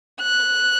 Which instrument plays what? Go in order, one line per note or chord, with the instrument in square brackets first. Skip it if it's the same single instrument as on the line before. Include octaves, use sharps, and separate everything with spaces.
[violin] F#6